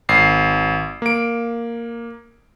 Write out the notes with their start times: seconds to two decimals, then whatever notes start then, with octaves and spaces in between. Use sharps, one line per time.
0.09 G#1 C7
1.02 A#3 D7